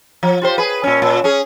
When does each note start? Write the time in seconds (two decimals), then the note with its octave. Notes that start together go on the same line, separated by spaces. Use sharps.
0.23 F3
0.42 F4 G4 C5
0.58 G#4 B4
0.83 A#2 C#4
1.02 A#2
1.24 C#4 G#4